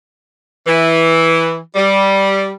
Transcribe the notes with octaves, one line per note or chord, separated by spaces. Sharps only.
E3
G3